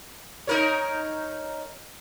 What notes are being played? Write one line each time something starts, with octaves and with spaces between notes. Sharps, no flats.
D#4 A#4 C#5